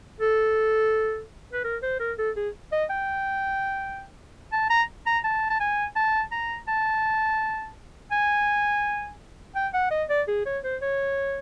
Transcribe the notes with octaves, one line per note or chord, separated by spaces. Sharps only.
A4
B4
A#4
C5
A#4
A4
G#4
D#5
G5
A5
A#5
A#5
A5
A5
G#5
A5
A#5
A5
G#5
G5
F#5
D#5
D5
G#4
C#5
C5
C#5